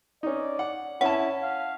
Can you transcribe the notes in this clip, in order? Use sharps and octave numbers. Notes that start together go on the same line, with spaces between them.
C#4 D#4 D5
F#5
C#4 E4 F#5 A5
F5